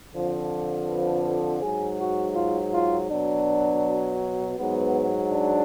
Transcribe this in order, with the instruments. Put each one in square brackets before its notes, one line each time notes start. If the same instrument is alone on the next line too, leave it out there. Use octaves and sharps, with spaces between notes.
[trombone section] F2 D3 F3
B4
G#2 F#3 G#4
F#4
F4
F4
B2 F#3 D4
G#2 F#3 B3
D4